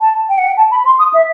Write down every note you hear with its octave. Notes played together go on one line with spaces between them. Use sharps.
A5
G5
F#5
G5
A5
B5
C6
D#6
E5